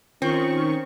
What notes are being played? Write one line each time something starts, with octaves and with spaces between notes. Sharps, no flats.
D#3 C4 C#4 F4 C#6